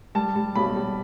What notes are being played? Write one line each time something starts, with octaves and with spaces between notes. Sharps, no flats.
G3 A5
G3
B1 B5
G3